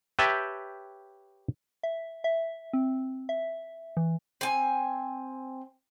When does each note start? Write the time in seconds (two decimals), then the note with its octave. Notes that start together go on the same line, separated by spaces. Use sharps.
0.19 G4 B4 C#5 E5 G5 A5
1.83 E5
2.24 E5
2.73 C4
3.29 E5
3.97 E3
4.41 C4 G#5